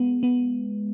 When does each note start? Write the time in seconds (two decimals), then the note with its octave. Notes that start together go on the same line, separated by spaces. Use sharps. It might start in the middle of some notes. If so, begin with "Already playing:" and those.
Already playing: G#3 B3
0.23 B3